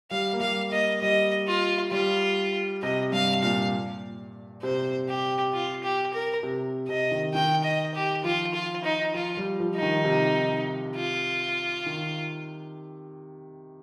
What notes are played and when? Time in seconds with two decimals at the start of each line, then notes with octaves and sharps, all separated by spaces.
0.11 G3 F5
0.33 A#3
0.41 G3 F5
0.71 A#3 D#5
1.01 G3 D#5
1.47 F4
1.91 G3 F4
2.82 C3 D#5
3.12 G2 F5
3.42 A#2 F5
4.62 C3 C5
5.08 G4
5.53 F4
5.84 G4
6.14 A#4
6.43 C3
6.89 C3 D#5
7.11 D#3
7.34 D#3 G5
7.64 D#5
7.94 G4
8.24 F3 F4
8.54 F4
8.84 D#4
9.14 F3 F4
9.37 G3
9.60 F3
9.75 D#4
9.82 D#3
10.04 C3
10.95 F4
11.86 D#3